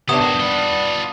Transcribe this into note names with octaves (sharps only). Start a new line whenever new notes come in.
C3 B3 C4 D4 C#5 D#6
D#3 F#4 G#4
G3 F4 F#5